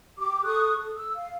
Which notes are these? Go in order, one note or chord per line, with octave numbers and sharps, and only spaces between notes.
G4 D6
A4 C#6 D#6 F#6
A4
E6
F5